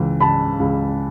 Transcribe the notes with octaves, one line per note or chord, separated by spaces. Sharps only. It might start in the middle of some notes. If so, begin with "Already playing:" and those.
Already playing: C#2 E3
C#3 A5 B5
C#2